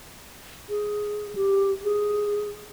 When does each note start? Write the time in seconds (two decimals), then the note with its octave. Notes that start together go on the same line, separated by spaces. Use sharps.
0.69 G#4
1.35 G4
1.84 G#4